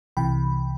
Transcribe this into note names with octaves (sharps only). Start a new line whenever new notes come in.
C2 C3 E3 G5 B5